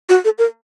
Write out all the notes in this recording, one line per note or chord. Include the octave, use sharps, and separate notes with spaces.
F#4
A4
A#4